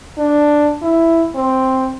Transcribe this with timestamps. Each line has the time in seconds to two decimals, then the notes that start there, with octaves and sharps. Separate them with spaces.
0.18 D4
0.82 E4
1.35 C4